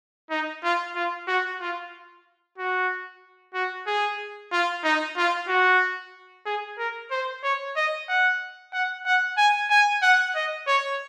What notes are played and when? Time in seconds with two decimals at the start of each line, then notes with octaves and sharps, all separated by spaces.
0.31 D#4
0.63 F4
0.96 F4
1.27 F#4
1.61 F4
2.58 F#4
3.54 F#4
3.87 G#4
4.52 F4
4.84 D#4
5.17 F4
5.49 F#4
6.46 G#4
6.78 A#4
7.11 C5
7.43 C#5
7.76 D#5
8.09 F#5
8.73 F#5
9.06 F#5
9.38 G#5
9.70 G#5
10.02 F#5
10.35 D#5
10.67 C#5